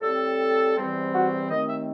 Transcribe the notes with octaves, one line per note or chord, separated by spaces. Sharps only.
A2 G3 C4 A4
E2 C3 E3 G3 C4
F#4
D#2 D#3 A3 C4 D#5
E5